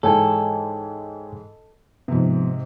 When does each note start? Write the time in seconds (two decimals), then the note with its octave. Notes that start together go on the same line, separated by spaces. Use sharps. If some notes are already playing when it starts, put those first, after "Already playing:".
0.03 G#2 E3 G#3 A4 C#5 G5 G#5
2.08 G#2 C3 F3 B3